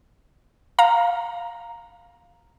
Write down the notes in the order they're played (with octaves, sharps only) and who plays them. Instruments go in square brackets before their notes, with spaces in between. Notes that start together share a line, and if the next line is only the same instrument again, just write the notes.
[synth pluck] F5 A#5